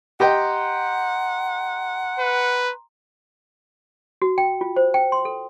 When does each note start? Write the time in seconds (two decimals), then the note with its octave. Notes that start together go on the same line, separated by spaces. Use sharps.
0.20 G4 D#5 F#5 G5 A#5 C6
2.20 B4
4.22 F#4
4.38 G5
4.61 F4
4.76 C5
4.94 G5
5.12 C6
5.25 A4